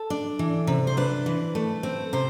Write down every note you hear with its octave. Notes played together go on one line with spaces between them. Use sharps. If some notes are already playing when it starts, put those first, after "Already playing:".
Already playing: A4
D4
E3
C3
C5
D4 B4
E3
A3
C4
C3 C5